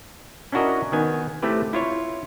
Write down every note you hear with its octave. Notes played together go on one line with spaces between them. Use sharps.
C#4 D4 E4 F#4 A#4 D#5
D#3 B3 G#5
A3 C4 E4 G4 B4
E4 F4 C#5